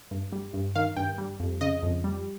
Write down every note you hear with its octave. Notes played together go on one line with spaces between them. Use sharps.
G2
G3
G2
D#3 F5
G2 G5
G3
F2
C#3 D#5
F2
G3